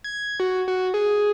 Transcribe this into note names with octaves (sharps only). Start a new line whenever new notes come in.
G#6
F#4
F#4
G#4